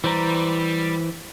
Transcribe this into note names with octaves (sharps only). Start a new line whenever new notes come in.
E3 G3 C5 A#5